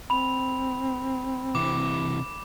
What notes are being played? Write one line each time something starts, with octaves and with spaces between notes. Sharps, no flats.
C4 B5 F7
C3 E3 D6